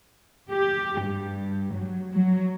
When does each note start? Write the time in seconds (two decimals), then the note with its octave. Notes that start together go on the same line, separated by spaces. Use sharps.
0.50 G4
1.01 G2
1.73 F#3
2.12 F#3